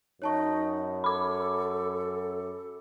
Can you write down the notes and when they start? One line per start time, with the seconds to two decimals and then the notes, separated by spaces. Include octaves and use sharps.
0.22 F#2 D#4 C#5 A5 C#6
1.04 A4 B5 D6